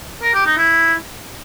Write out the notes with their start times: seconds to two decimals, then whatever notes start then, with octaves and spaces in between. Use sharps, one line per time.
0.22 A#4
0.34 G4
0.46 D#4
0.57 E4